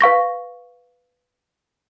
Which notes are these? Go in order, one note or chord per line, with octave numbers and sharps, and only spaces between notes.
B4 F5 C#6 A#6